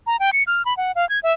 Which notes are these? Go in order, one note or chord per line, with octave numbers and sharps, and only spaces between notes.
A#5
G5
C#7
F6
B5
F#5
F5
G#6
E5